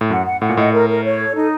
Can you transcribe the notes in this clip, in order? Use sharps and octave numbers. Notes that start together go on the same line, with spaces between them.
A2
F#2 F#5
F#5
A2 F#5
A#2
A2 D#5
A#4
A#4
C#5
A4
D#4